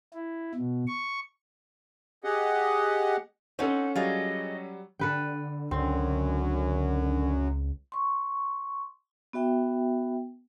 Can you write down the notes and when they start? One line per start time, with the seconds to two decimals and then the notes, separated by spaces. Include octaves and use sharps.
0.14 E4
0.55 B2
0.87 C#6
2.24 G4 G#4 D#5 F#5
3.59 C4 C#4 D#4 A4 F#5
3.95 F#3 G3 F4 G#4 D#5
4.99 D3 A4 B4 G5
5.71 C#2 F#2 D3 C4
7.92 C6 C#6
9.33 B3 F#4 E5 G5